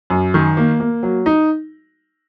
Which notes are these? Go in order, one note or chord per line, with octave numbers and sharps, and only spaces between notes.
F#2
D#3
A#3
A#3
F#3
D#4